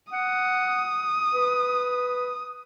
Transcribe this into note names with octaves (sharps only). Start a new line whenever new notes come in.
F#5 D#6
B4